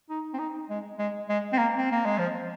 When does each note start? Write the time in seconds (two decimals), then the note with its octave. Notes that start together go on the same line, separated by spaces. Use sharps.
0.10 D#4
0.34 C4
0.39 D#4
0.70 G#3
0.99 G#3
1.29 G#3
1.53 C4
1.58 A#3
1.78 C4
1.92 A#3
2.05 G#3
2.18 F3